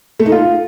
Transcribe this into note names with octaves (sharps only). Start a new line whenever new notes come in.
A3
D#4
F4